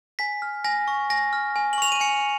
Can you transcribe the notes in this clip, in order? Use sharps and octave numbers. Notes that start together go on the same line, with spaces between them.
G#5 B6
F6
G#5 A#6
C#6
G#5 A#6
F6
G#5
F#7
C#6 F7
D#7
G#5 C#7